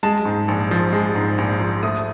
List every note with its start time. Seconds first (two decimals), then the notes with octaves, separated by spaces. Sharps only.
0.03 G#3 A5
0.25 G#2
0.48 A#1
0.71 F3
0.93 G#3
1.15 G#2
1.38 A#1
1.60 F3
1.83 A3 D#6